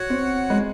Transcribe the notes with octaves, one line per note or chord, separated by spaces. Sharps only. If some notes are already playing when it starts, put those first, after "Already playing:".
Already playing: F#4 C#5 F#5
C4
G#3